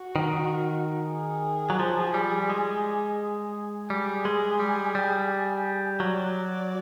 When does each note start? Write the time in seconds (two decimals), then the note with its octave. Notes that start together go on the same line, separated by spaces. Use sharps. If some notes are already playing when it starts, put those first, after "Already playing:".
Already playing: F#4
0.16 D#3
1.09 G#4
1.70 F#3
1.79 F3
2.14 G3
2.50 G#3
3.89 G3 G#4
4.25 G#3
4.60 G3
4.95 G3
5.99 F#3 D5